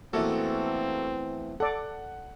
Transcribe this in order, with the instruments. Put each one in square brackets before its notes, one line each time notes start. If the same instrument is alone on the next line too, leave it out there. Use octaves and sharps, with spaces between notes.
[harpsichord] E2 E3 A3 [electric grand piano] A#3 F#4 A4 [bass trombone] C4
[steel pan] A4 D5 [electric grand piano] F#5